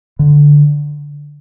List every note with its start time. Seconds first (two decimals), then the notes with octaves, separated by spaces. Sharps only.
0.19 D3